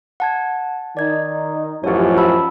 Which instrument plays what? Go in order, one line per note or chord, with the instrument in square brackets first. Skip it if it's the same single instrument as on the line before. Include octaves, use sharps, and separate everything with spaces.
[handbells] F#5 A5 G#6
[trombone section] D#3 D#4 [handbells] D5 G#6
[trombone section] A1 F#2 F3 [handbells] G4 C#5
[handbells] A5 B5 E6